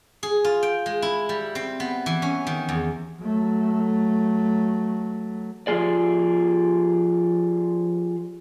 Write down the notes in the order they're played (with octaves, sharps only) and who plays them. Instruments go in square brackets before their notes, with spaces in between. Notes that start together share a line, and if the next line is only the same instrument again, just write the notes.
[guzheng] G#4
F4
G5
G#3
E4
G3
C4
B3
E3
C#4
D#3
E2
[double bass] F#3 A3
[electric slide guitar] F3 F4 G4 G#4 D5